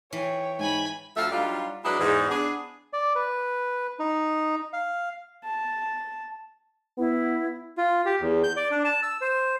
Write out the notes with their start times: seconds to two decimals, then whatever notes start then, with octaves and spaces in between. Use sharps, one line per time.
0.13 E3 C#5 G5
0.59 G#2 G#5 B5
1.17 D2 F3 A3 E5 F5
1.32 F#3 G3 D4 D#4 F4
1.85 F#3 G#3 D4 E4 B4 D#5
2.00 E2 G#2
2.30 B3 D4 G#4
2.93 D5
3.15 B4
3.99 D#4
4.73 F5
5.44 A5
6.98 B3 E4
7.78 F4
8.06 G4
8.21 E2
8.44 G6
8.57 D5
8.71 D4
8.84 A5
9.03 E6
9.21 C5